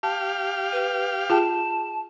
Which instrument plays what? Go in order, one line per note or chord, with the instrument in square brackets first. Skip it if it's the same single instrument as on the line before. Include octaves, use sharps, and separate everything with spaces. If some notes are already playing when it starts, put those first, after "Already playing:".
[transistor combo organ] G4 F5 [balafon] A5
[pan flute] B4
[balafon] F4 G#4 G5 [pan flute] A5